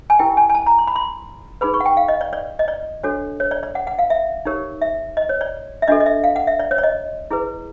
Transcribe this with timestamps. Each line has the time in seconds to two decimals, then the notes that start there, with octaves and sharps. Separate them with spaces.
0.10 G#5
0.19 E4 G4 A#4 G5
0.37 G#5
0.50 G#5
0.54 A5
0.66 A#5
0.78 C6
0.87 B5
0.96 C6
1.61 D#4 G#4 B4 B5
1.74 C#6
1.80 F#5
1.86 G5
1.97 F5
2.08 D#5
2.21 D5
2.33 D5
2.59 D#5
2.68 D5
3.03 D4 F#4 A4 C#5
3.40 C#5
3.51 D5
3.63 D5
3.75 F#5
3.87 F#5
3.99 F5
4.10 E5
4.45 D#4 G4 A#4 C#5
4.82 E5
5.17 D#5
5.29 C#5
5.41 D5
5.82 E5
5.88 D4 F#4 A4 D#5
6.00 D#5
6.06 E5
6.24 F5
6.36 F#5
6.47 E5
6.59 D5
6.71 C#5
6.78 D5
6.84 D#5
7.31 E4 G#4 B4